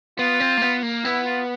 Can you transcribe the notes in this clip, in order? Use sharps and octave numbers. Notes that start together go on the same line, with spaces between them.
B3 F4
C4
A#3
B3
A#3
B3 E4
F4